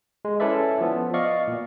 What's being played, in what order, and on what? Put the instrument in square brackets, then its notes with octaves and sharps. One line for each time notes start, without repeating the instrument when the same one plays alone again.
[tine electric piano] G#3
C#4 E4 A4 B4 D5 E5
F3 B3
D5 D#5 F5 C#6
A#2